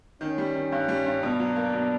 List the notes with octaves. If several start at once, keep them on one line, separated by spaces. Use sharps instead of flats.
D#3 C#4
G3
D#3
G2
G3
G2
B2 D4
F#3
A#3
B2